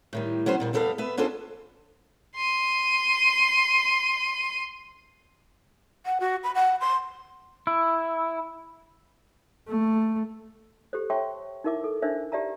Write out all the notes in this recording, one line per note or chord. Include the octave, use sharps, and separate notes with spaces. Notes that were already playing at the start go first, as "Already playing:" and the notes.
A2 D#3 G3
F#3 B3 C#4 C5
A#2 G3 C4
E2 G3 B3 A4 C#5 F5
B3 B4 E5
C#4 D4 F4 G#4 A4 C5
C6 D#7
F#5
F#4
B5
F#5
C6
E4
A3
G4 A4 C5
C#5 E5 G5 A5 C6 C#6
D#4 E4 A#4 E5 D6
A4
D4 D#4 A#4 C5 E5
G4 D5 E5 A5 A#5